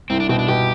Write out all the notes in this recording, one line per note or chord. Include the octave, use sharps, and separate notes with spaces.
C2 C4
D4
B2 C4
D4
B2 G4